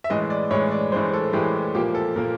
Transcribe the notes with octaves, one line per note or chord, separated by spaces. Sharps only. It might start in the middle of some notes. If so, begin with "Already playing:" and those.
E5
A2 E3 G#3 D#5
D5
A2 E3 G#3 C#5
D5
A2 E3 G#3 C5
A4
A2 E3 G#3 G4
A#2 F3 A#3 G4
A4
A#2 F3 A#3 A#4